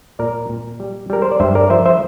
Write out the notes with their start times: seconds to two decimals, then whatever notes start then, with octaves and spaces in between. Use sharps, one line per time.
0.19 A#2 A#4 D5
0.49 A#2
0.80 G3
1.10 G3 A#4
1.22 C5
1.32 D5
1.40 G2 C5 E5
1.55 A#4 D5
1.70 F3 C5 E5
1.86 C5 E5